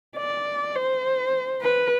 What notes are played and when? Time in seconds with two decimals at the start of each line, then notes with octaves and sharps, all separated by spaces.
0.17 D5
0.75 C5
1.62 B4